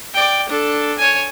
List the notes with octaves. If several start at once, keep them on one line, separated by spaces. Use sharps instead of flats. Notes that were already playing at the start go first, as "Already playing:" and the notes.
D5 G5
D4 A4
C#5 G#5